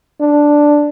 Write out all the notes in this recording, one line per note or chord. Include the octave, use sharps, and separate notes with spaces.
D4